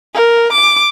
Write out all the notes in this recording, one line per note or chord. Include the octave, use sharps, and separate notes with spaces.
A#4
D6